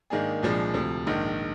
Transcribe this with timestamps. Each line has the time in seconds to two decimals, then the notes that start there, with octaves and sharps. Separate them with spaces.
0.10 G#2 D#3 A#3 D4 G#4
0.43 C2 A#2 F3 G#3 D4
0.74 D2 C3 F3
1.07 A#1 G#2 D#3